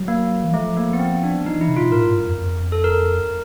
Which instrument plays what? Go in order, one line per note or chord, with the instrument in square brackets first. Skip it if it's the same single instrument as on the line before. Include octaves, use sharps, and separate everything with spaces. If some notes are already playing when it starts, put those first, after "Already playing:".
Already playing: [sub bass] F#3
[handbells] A#3
[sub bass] E3
[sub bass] F3 [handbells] A3
[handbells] A#3
B3
C4
D4
[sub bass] F3 [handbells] D#4
[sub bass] E3 [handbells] E4
[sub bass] C3
[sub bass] B2 [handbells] F4
[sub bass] A2 [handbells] A#4
[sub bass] G#2
G2
F2
F2
[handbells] A4
A#4